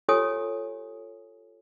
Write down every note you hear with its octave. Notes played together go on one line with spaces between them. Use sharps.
F4 G4 A4 C#5 G#5 D#6